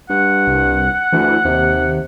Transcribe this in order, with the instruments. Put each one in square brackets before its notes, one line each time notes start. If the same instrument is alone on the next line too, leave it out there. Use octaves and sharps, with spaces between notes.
[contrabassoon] G2 [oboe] F#5
[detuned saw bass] C2
[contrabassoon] D2 [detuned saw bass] E3
[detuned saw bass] D#2 [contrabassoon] C3